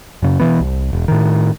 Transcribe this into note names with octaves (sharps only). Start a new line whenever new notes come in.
F#2 C#3
B2 E3 B3
C2
E1
A2 D#3